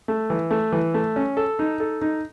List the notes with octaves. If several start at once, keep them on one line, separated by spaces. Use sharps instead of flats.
A3
E3
A3
E3
A3
C#4
A4
D#4
A4
D#4